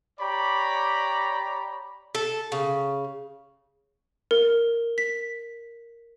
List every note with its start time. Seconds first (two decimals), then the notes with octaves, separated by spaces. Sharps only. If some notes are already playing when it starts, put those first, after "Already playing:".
0.20 G4 C#5 D5 A#5 B5
2.15 A4
2.52 C#3
4.31 A#4
4.98 B6